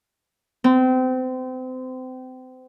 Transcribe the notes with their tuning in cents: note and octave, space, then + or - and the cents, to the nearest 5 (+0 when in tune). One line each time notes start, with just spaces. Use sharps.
C4 -30